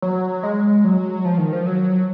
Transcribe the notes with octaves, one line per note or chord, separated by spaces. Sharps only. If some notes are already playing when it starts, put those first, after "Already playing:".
F#3
G#3
F#3
F3
D#3
F3
F#3